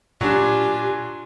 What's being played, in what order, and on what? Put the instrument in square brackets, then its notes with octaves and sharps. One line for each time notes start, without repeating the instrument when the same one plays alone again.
[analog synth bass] A#2 [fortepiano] F#3 D4 [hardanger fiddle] F4 G#5 [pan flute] G4